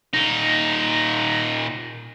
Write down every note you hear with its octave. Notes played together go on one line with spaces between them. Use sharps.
A#2 D#4